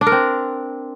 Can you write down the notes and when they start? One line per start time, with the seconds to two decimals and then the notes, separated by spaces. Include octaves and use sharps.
0.01 D4
0.07 A#4
0.12 C4